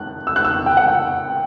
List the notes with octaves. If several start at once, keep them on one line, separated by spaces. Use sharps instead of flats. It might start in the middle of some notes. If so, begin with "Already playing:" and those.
Already playing: F#6
E6
F#6
E6
G5
F#5
G5